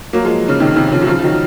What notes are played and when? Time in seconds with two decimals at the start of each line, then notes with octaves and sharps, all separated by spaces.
0.13 F#3 A#3
0.25 F3 G#3
0.48 C#3
0.60 C3 D#3
0.76 C3 D#3
0.87 D#3
0.92 C#3 F3
1.02 F#3
1.07 C#3 F3
1.19 F3
1.23 D#3 F#3